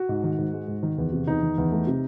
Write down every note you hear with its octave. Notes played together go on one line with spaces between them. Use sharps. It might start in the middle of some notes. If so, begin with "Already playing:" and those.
Already playing: F#4
G#2
D#3
G#2
G#3
G#2
D#3
E2
C3
E2 D#4
D#3
E2
A3
C3